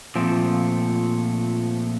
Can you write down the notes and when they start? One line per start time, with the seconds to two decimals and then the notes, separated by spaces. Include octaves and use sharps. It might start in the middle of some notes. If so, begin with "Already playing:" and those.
0.15 A#2 F3 A3 C4